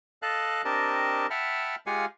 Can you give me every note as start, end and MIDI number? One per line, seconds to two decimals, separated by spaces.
0.22 0.62 69
0.22 0.62 75
0.22 0.62 77
0.22 0.62 81
0.22 0.62 90
0.65 1.26 60
0.65 1.26 62
0.65 1.26 67
0.65 1.26 70
0.65 1.26 75
0.65 1.26 81
1.30 1.75 76
1.30 1.75 78
1.30 1.75 79
1.30 1.75 81
1.30 1.75 83
1.30 1.75 89
1.87 2.06 56
1.87 2.06 65
1.87 2.06 67
1.87 2.06 77
1.87 2.06 78
1.87 2.06 80